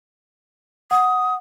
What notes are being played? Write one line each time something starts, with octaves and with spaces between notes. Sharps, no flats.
F#5 D#6